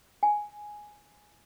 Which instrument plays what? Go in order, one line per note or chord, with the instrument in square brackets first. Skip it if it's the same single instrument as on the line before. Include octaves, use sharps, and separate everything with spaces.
[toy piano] G#5